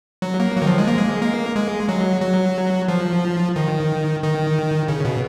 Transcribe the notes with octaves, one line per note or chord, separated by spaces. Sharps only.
F#3
A#3
F#3
D#3
F3
G#3
A#3
G#3
A#3
G#3
F#3
F#3
F3
D#3
D#3
C#3
B2